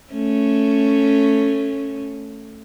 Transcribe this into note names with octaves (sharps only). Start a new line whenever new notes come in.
A3 C#4